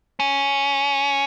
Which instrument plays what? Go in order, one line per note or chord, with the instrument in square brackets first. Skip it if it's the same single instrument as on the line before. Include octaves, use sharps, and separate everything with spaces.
[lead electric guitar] C#4